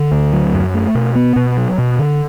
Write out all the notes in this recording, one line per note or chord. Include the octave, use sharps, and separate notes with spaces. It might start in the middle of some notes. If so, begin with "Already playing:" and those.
Already playing: D3
D2
F#3
F#2
A3
B2
B3
B2
F#3
B2
D3